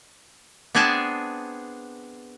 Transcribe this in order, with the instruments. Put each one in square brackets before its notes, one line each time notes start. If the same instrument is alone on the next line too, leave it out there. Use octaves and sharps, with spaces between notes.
[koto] B3 C4 D4 G#4 G#5 A5